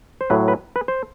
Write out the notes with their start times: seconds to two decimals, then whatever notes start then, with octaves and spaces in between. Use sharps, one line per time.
0.21 C5
0.30 A2 F#3 B4
0.48 B4
0.76 B4
0.88 C5